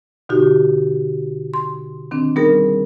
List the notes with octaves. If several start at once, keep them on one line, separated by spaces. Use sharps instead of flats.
B2 D3 D#4 F#4 G4
C6
D#3 C4 D4
G3 B3 D#4 G#4 A#4